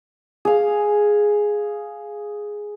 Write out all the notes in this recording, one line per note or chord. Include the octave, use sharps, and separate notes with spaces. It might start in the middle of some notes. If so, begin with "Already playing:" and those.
G#4 F5